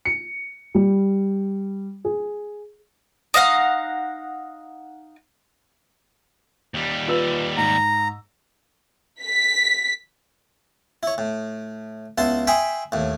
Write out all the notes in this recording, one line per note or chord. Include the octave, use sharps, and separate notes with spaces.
C#7
G3
G#4
D#4 D#5 F5 F#5
D#2 G3
F4 B4 E6
G#2 A#5
B6
E4 C#5
A2
C#2 B3 E4 A5 C6
E5 G5 G#5 B5 C6 D#6
D#2 A2